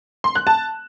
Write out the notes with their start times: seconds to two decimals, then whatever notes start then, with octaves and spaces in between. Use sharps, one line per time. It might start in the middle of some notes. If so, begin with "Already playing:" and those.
0.24 C6
0.35 F#6
0.47 A5